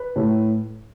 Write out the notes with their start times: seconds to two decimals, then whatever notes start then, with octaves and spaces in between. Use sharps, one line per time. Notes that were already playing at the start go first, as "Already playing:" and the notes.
Already playing: B4
0.16 A2 A3 E4